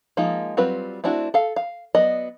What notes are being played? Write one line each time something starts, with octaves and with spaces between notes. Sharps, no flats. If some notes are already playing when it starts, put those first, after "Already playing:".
F3 G#3 A#3 D#4 F4
F#3 G3 C4 F4 B4
A3 C4 D4 E4 F#4
A4 F5
F5
F#3 B3 D5 D#5